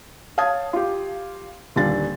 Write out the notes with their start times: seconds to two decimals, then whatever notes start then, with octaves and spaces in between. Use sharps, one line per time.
0.38 C#5 F5 A5 D#6 G#6
0.73 F4 G4
1.76 D#1 D3 G3 D4 F4 A6